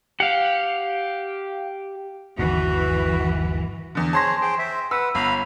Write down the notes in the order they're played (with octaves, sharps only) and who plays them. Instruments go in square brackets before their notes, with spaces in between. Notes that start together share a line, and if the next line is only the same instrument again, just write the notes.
[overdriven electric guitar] G4 [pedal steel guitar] F5 F#5
[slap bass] G1 D#2 [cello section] E3 [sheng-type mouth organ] F#4
[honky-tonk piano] E2 D3
[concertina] G#4 C5 C#5 [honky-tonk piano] A5 C6 A#6
[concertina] G#4 C5 G5
C5 E5
[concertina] B4 F#5 [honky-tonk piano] E6
[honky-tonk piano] G1 [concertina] F5 A#5 B5